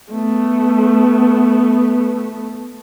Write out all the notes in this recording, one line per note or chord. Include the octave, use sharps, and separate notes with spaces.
A3 B3